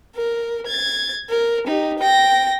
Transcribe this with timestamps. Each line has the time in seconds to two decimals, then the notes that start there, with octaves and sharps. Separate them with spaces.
0.16 A#4
0.67 G#6 A6
1.29 A#4
1.67 D#4 G4
1.99 G5 A#6